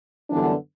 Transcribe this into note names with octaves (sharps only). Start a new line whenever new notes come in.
F#2 D3 E3 G3 B3 D4